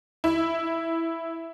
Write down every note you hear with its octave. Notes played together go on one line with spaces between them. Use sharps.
E4